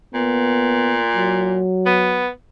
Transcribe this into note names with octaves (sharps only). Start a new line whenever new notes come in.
A#2 B3
F#3
B3